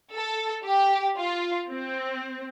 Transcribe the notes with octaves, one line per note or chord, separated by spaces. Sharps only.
A4
G4
F4
C4